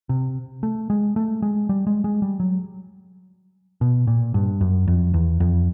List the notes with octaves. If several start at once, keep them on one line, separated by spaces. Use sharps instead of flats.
C3
A3
G#3
A3
G#3
G3
G#3
G#3
G3
F#3
B2
A#2
G2
F#2
F2
E2
F2